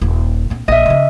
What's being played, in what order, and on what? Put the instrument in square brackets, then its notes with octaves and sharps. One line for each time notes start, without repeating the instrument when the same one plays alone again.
[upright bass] D#1
A#1 C4
[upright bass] A#1 [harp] D#5 E5
[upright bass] C#3 C#4